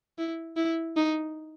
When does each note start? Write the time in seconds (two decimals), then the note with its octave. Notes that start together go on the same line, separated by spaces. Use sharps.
0.18 E4
0.57 E4
0.97 D#4